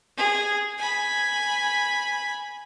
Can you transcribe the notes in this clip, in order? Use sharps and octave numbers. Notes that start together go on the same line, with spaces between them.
G#4
G#5 B5